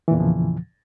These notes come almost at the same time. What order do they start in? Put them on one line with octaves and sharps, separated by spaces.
E3 A#2 E2 C#3 F3